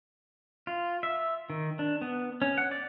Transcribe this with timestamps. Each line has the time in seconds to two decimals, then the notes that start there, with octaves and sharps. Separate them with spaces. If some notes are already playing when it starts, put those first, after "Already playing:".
0.67 F4
1.03 E5
1.50 D#3
1.79 D4
2.02 B3
2.42 C#4
2.58 F#5
2.71 D5